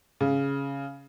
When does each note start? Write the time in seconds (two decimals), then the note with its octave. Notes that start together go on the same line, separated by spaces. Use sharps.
0.21 C#3